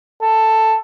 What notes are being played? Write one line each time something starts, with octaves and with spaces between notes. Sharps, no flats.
A4